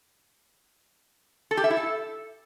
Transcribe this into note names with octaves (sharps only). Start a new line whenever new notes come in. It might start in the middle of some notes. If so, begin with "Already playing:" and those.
A4
G4
E5
E4
A4